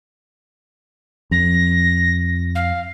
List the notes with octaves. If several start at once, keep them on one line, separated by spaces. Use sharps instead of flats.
F2 A#6
F5